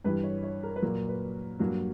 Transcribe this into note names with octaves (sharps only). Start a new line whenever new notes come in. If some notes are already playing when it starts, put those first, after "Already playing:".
G2 E3 G3 B4
C#5
C#5
A#4
B4
A#2 F#3 A#3 A#4
B4
G2 F#3 A#3 F#4